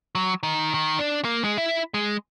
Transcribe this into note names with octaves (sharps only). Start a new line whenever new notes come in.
F#3
D#3
D#3
D4
A#3
G#3
E4
G#3